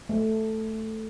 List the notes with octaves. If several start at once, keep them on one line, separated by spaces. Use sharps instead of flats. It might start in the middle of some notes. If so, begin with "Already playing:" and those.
A3